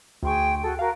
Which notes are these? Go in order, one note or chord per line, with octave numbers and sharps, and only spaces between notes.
D2 G#4 G5 C6 C#6
F#4 G#4 A4
F#4 A#4 F5